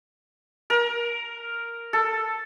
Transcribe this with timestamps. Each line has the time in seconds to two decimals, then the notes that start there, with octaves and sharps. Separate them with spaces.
0.70 A#4
1.93 A4